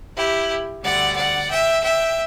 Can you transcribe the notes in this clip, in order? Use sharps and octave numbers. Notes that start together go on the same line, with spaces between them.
E4 G4
D2 D3 G3 D5 F#5
D5 F#5
E5 G5
E5 G5